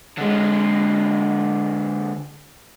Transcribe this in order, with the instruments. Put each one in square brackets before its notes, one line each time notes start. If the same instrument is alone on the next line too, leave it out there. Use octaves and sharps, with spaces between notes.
[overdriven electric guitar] D3 G#3